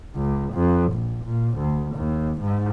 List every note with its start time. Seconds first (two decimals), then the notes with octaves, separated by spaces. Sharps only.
0.16 C#2
0.53 F2
0.93 A#1
1.24 A#2
1.57 D2
1.96 D#2
2.41 G#2